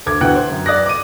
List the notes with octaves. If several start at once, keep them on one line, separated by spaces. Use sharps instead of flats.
D2 D6 G#6
D2 B2 E3 F#5 G5 F#6
C5
F#2
D5 D#6 F#6 A#6
D6 D#7